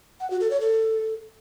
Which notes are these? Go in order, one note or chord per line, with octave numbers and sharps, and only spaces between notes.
F#5
F#4
A4
C#5
A4